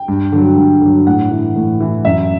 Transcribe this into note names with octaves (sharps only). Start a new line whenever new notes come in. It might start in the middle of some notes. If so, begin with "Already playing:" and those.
Already playing: G5
G2
D3 F#3
G2
D3 F#3
A2 F#5
E3
A2
E3
F#2 E5